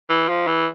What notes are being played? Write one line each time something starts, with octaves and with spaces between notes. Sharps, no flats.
E3
F3
E3